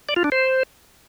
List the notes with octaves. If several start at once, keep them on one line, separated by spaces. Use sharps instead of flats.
D5
F4
D4
C5